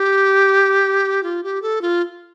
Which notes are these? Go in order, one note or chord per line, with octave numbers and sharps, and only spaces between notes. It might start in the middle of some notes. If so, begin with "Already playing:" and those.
Already playing: G4
F4
G4
A4
F4